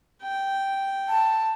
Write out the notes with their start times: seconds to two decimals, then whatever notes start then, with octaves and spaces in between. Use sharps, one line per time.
0.23 G5
1.09 A5